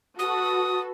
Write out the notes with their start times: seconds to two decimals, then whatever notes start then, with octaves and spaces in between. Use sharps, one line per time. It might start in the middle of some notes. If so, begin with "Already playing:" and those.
0.19 F#4 A4 B4 D#6